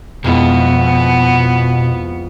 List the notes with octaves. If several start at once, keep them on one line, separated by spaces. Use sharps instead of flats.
F2 B2 G#3 B3 E4